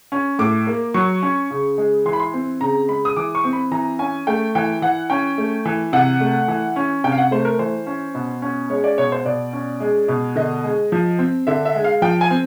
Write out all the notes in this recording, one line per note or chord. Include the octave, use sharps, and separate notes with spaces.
C#4
A2 D6
A#3
F#3 C#6
C#4
C#3
G#3
E3 C6
B5
C6
C4
C#3 A#5
G#3 B5
D#6
E3 D6
C#6
C4
B5
E3 A#5
C#4 G#5
A3 G5
E3 G5
E3 F#5
C#4 G5
A3
E3
C3 F#5
A3
E3
C#4
C3 G5
F5
F#5
A3 C5
A#4
E3 C5
C#4
B2
C#4
G#3 C#5
D5
B2 C#5
C5
B2 D5
C#4
G#3
B2
D3 D#5
G#3
F3
C4
D3 E5
E5
G#3
F5
F3 G5
G#5
C4